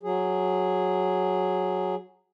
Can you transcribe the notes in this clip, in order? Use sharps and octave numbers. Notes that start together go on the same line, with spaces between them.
F#3 G#4